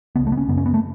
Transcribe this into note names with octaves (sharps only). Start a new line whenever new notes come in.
C#2 C#3 B3
A3
B3
C#4
F#2 C#3 B3
C#4
B3
A3